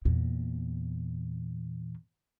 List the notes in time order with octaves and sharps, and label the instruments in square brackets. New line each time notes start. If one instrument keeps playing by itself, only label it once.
[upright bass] E2 A#2